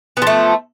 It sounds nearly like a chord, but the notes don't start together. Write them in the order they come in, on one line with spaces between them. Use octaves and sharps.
B3 F3 A3